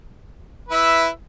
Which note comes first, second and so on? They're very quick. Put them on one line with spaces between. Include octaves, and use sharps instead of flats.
B4 E4 E5